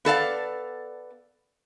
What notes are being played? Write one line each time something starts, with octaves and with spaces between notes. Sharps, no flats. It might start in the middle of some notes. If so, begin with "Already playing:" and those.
B3 A4 D5 F5